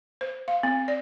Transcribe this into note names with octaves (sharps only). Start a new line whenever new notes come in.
C5
F5
C4
D5